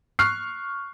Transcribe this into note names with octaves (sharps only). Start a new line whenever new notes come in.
C#6 F6 F#6 C7